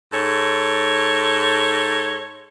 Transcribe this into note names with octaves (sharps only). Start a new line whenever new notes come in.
G#2 A4 C#5